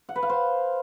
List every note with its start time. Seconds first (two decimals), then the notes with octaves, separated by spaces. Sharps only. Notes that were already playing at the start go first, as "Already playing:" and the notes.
0.09 F#5
0.16 B4
0.23 F5
0.30 C5